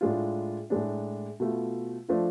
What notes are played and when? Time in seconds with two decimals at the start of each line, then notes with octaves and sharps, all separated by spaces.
0.01 A2 G#3 D4 F4
0.70 A2 G#3 D4
1.40 B2 A3 F4
2.08 F3 A3 D4 F4